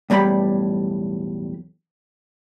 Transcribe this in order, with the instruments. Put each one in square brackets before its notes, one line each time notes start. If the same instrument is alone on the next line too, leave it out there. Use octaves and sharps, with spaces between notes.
[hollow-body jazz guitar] B1 E2 A2 G3 B5